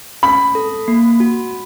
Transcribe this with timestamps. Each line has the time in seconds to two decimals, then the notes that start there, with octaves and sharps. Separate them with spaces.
0.23 C#4 B5
0.55 A4
0.88 A#3
1.20 F#4